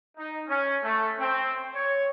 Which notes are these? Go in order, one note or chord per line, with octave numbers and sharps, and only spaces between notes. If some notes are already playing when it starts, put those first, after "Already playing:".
D#4
C#4
A3
C4
C#5